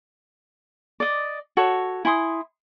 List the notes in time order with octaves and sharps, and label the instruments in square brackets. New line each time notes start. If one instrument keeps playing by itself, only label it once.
[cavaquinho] D5 D#5
F#4 A4 C#5
E4 G#5 C6 D#6